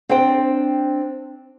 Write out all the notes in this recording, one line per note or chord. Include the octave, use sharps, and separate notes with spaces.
C4 D4 C5 G5